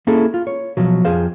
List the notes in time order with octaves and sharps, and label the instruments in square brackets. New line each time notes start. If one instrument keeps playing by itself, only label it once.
[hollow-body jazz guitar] A#3 C#4 E4 G#4 A4
F4
C#5
B2 F3 F#3
F2 G#4 C5 F5